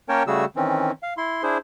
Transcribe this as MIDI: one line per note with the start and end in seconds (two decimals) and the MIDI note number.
0.09 0.23 58
0.09 0.23 61
0.09 0.23 70
0.09 0.23 73
0.09 0.23 79
0.09 0.23 81
0.27 0.45 49
0.27 0.45 55
0.27 0.45 57
0.27 0.45 66
0.27 0.45 68
0.27 0.45 88
0.56 0.91 51
0.56 0.91 52
0.56 0.91 60
0.56 0.91 61
1.03 1.14 77
1.17 1.43 64
1.17 1.43 84
1.43 1.58 62
1.43 1.58 64
1.43 1.58 68
1.43 1.58 72